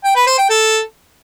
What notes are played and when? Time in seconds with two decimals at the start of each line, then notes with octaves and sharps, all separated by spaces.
0.04 G5
0.15 B4
0.27 C5
0.38 G5
0.49 A4